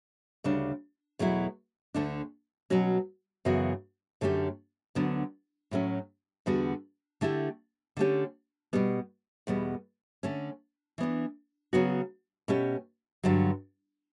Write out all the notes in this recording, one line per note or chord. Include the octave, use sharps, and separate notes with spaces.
D2 C#3 G3 D4
E2 B2 F#3 A3 E4
D2 D3 A3 D4
B2 F#3 C#4 F#4
F#2 C#3 E3 B3 F#4
F#2 D3 A3 C#4 G4
D2 D3 F#3 B3 D4
A2 F#3 A3 C#4
E2 D3 G3 B3 F#4
D3 A3 E4 G4
D3 A3 C#4 G4
B2 G3 B3
E2 B2 G3 B3
D3 A3 C#4
E3 B3 D4
C#3 F#3 B3 F#4
B2 A3 C#4 G4
G2 D3 F#3